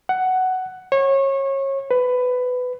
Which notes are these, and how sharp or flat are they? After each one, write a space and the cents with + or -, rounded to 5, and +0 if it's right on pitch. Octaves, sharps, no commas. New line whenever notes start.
F#5 +10
C#5 -25
B4 +15